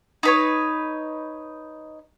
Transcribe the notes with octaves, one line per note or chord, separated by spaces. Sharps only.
D#4 B4 C#5